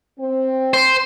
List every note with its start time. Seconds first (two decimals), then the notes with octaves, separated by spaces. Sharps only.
0.20 C4
0.74 C5